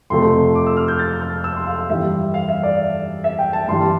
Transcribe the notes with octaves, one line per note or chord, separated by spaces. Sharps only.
F2 C3 F3 A3 C6
D6
E6
F6
G6
A6
F6
E6
C6
F5
G2 E3 G3 E5
F5
E5
D5
E5
G5
A5
G2 E3 G3 C6